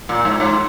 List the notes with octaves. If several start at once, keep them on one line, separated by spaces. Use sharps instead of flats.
A#2
G#2
G#2